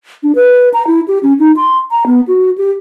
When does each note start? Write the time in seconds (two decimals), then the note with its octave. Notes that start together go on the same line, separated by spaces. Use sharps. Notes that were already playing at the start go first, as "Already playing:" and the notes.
0.23 D4
0.35 B4
0.74 A#5
0.87 E4
1.08 G4
1.23 C#4
1.39 D#4
1.57 C6
1.91 A#5
2.06 B3
2.28 F#4
2.58 G4